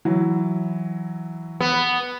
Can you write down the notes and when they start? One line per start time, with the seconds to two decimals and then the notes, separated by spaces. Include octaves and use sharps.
0.05 E3 F#3 E4
1.60 B3